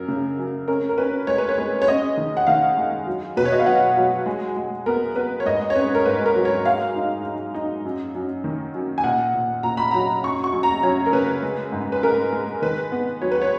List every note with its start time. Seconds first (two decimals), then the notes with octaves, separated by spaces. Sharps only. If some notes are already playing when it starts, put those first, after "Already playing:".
Already playing: F#2 A#4
0.08 C#3
0.39 F#2
0.68 C#4 A#4
0.89 A#4
0.98 C#4 B4
1.27 G#3 C#5
1.38 B4
1.49 C#5
1.58 G#3
1.82 C#5
1.88 C#4 D#5
2.17 D#3
2.37 F#5
2.47 D#3 F5
2.77 G#3
3.07 F#3
3.37 B2 B4
3.45 C#5
3.52 D#5
3.60 F5
3.66 F#3 F#5
3.97 F#3
4.26 G#3
4.56 G#3
4.86 B3 A#4
5.15 B3 B4
5.40 C#5
5.45 G#2 D#5
5.70 C#5
5.75 C#4 B4
5.95 A#4
6.06 G#2 B4
6.26 A#4
6.36 F#3
6.45 C#5
6.65 G#3 F5
6.95 D#4
7.25 D#4
7.54 D#4
7.85 F#2
8.15 F#2
8.44 D#3
8.74 F#2
8.98 G#5
9.04 A#2 F#5
9.34 A#2
9.63 A#2 A#5
9.77 B5
9.91 F#3 A#5
10.23 F#2 C#6
10.44 C#6
10.53 F#2
10.63 A#5
10.83 F#2 C#5
11.06 A#4
11.13 C#3 B4
11.42 G#3
11.72 G#2
11.92 B4
12.03 G#3 A#4
12.33 G#3
12.62 D#3 B4
12.92 B3
13.22 F#3 C#5
13.32 B4
13.42 C#5